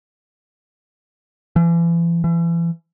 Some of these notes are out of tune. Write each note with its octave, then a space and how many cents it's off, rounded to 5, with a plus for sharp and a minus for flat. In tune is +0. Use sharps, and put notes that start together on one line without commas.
E3 +40
E3 +35